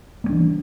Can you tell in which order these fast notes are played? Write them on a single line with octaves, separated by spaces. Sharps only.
A#3 G3 D4 E3